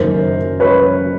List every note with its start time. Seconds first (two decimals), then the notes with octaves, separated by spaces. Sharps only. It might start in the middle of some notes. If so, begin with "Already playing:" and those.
Already playing: F#1 F#2 D#3 A#4 C5
0.60 B4 C#5